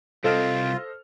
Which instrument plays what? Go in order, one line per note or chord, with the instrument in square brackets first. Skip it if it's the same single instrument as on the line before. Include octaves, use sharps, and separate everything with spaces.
[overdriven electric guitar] C2 C4 [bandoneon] F4 [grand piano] A4 [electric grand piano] C5 D#5 F6